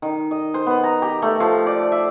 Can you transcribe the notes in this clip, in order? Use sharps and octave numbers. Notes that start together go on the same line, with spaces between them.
D#3
D#5
C5
B3
A#5
G4
A3
F3
D5
E5